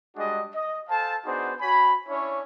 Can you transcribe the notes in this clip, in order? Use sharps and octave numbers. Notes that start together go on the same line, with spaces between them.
G3 G#3 D4 F#4 G#4 D#5
D#5
A4 C5 F5 G#5 A5
B3 D4 D#4 F#4 G#4 C5
F#4 C#5 G#5 B5
C#4 D4 E4 C#5